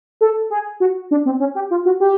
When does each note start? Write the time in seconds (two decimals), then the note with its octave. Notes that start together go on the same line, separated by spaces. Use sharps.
0.21 A4
0.50 G#4
0.80 F#4
1.11 D4
1.26 C4
1.40 C#4
1.55 G4
1.71 F4
1.85 F#4
2.00 G4